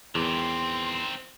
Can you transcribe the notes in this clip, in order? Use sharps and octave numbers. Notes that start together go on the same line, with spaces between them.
E2 D#3 C4 C6